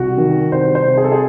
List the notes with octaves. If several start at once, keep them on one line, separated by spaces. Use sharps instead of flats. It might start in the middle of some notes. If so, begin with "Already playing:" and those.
Already playing: C2 F#4
D#3
C2 C5
C5
C3
G#4
A4
G#4